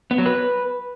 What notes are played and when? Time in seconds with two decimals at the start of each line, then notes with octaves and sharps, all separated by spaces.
0.11 B3
0.18 F#3
0.26 B4